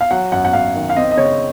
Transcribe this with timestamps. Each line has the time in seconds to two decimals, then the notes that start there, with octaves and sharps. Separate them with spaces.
0.01 F5
0.11 F#3 F#5
0.32 F#2 F#5
0.45 F#5
0.53 F#2 F5
0.75 D#3
0.90 F5
0.96 C4 D#5
1.11 D#5
1.17 C#3 C#5